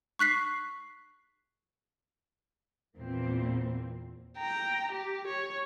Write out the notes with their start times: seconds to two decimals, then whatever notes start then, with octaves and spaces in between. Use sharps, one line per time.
0.19 C#6 F#6 B6 C7
2.96 E2 A#2 A#3 C4
4.38 G5 A#5
4.92 G4
5.27 C#5